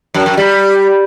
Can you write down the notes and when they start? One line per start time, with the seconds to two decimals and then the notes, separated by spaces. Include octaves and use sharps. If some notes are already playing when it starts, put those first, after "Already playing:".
0.14 F#2
0.26 F#2
0.37 G3